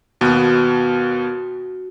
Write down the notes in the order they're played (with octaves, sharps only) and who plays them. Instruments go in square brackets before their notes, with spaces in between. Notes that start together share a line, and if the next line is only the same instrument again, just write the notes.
[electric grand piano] D#2 B2 B3 [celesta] F#4